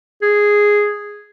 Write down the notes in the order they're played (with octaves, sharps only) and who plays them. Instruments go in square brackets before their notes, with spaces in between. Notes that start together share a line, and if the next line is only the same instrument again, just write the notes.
[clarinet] G#4